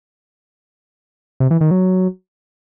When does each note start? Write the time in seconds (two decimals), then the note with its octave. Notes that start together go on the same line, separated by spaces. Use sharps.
1.40 C3
1.51 E3
1.61 D#3
1.71 F#3